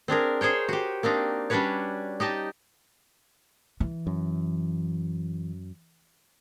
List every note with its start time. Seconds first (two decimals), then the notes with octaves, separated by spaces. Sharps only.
0.08 C4 D4 G#4 A#4
0.41 G#4 C5 C#5 G5
0.69 F#4 G4
1.03 A#3 C4 D4 D#4
1.50 G3 C#4 D4 F#4 B4 C#5
2.20 D#4 G4 D#5 A5
3.80 E3
4.07 F#2